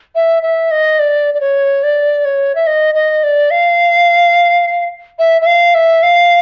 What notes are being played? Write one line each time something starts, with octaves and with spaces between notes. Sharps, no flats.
E5
E5
D#5
D5
D5
C#5
D5
C#5
E5
D#5
D#5
D5
F5
E5
E5
F5
E5
F5